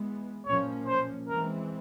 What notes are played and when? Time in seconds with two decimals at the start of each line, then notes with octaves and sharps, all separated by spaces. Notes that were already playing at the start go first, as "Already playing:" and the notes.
Already playing: E3 G#3 B3
0.46 A#2 F3 A#3 C#4 C#5
0.87 C5
1.28 E3 G#3 C4 A#4